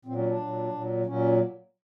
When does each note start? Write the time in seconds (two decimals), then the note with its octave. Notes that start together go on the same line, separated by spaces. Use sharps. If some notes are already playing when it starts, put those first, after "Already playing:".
0.05 A#2 F#3 C4
0.17 C#4
0.28 D4
0.39 A#2 F#3
0.72 A#2 F#3
1.05 A#2 F#3 C#4